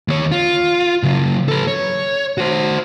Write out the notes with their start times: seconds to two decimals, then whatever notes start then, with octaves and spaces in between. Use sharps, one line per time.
0.08 D#2 C#5
0.32 F4
1.03 C#3 F#3
1.48 A4 B4
1.67 C#5
2.38 F#4 C5